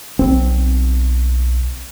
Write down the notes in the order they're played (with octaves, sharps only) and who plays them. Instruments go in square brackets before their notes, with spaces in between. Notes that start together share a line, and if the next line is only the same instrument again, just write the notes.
[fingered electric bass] B1 C4